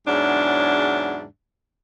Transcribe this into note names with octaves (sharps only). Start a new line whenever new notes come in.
E2 G#2 C#3 F#3 D4